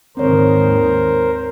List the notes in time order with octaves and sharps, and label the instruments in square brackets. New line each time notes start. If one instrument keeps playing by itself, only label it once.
[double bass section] D#2 G#2 D#3 [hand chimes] C4 C#5 [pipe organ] A#4 C5